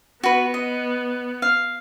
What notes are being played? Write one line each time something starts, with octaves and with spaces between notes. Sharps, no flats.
B3 F#4 B4
D#5
F5